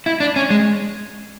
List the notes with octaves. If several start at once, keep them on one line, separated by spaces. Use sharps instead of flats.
E4
D4
C#4
G#3